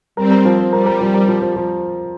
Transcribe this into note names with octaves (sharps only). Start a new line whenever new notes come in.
G3 C4 A#4
A#4
F3
C4
G3 A#4
A#4
F3
A#4
F3
F3
F3